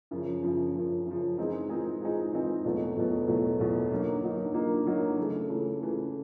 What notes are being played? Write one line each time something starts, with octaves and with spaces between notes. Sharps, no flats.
F#2 C#3 F3
F#2 C#3 F3
F#2 C#3 F3
F#2 C#3 F3
E3 G#3 C4 D#4 G#4
E3 G#3 C4 D#4 G#4
E3 G#3 C4 D#4 G#4
E3 G#3 C4 D#4 G#4
E2 B2 F#3 A3
E2 B2 F#3 A3
E2 B2 F#3 A3
E2 B2 F#3 A3
D3 F#3 A#3 D#4
D3 F#3 A#3 D#4
D3 F#3 A#3 D#4
D3 F#3 A#3 D#4
C#3 E3 A3
C#3 E3 A3
C#3 E3 A3